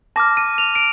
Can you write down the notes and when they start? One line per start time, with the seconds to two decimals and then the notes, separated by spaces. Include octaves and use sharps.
0.16 A5 D6 F6 A#6
0.37 D#7
0.58 F7
0.75 D7